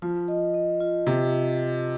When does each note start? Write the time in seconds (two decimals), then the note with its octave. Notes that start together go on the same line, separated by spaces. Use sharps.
0.02 F3 F4
0.28 D#5
0.54 D#5
0.80 F4
1.06 C3 D#5
1.32 F4
1.59 F4